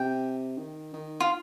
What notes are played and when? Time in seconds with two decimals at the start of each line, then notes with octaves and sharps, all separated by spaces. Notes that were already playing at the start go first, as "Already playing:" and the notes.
Already playing: C3 G5
0.57 D#3
0.93 D#3
1.20 F4